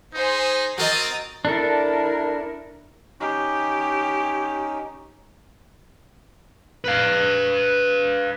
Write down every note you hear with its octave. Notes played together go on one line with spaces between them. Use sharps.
D#4 G#4 C5
C4 F#4 A#4 D#5 A#5 D#6 A6
D4 E4 A4 A#4
C#4 D#4 G4
B4 F5